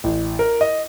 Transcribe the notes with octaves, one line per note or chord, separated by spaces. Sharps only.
A1
A#4
D#5